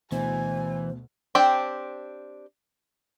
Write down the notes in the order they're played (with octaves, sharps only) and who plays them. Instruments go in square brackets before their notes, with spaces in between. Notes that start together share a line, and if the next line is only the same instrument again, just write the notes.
[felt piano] D2 B2 [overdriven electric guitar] E3 [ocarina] C5 [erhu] G#5
[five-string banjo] C4 D4 G4 C5 G5